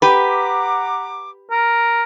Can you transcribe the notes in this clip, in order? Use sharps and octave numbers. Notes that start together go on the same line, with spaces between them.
G4 B4 F#5 A#5 D6
A#4